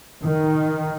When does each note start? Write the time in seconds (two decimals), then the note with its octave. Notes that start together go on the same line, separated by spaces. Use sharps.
0.23 D#3